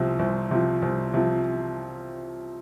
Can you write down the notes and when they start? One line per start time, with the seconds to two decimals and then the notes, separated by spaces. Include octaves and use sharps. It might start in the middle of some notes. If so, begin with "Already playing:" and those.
Already playing: C2 C3 F3
0.19 C2
0.51 C3 F3
0.82 C2
1.14 C3 F3